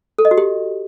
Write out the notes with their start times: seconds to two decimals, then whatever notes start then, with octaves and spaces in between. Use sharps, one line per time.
0.19 A4
0.25 D#5
0.31 F#4
0.38 G4